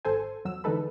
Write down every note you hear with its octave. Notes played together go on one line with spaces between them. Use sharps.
G#1 A4 C5 G#5
E2 F#3 E6
D3 E3 G#3 D#4 A4 B4